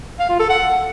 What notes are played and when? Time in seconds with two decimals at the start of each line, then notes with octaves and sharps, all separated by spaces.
0.19 F5
0.29 F4
0.39 A4
0.50 F#5